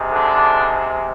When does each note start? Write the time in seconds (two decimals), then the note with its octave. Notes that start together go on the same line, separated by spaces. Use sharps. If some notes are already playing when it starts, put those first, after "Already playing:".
Already playing: C3 D#3 G#3
0.12 D3 D4